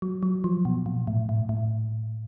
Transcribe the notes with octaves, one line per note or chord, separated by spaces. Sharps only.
F#3
F#3
F3
B2
A#2
A2
A2
A2